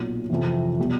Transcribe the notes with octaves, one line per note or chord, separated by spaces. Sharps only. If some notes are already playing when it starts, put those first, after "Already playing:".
Already playing: B1 A#2 F#3
F2 C3 E3
B2 G3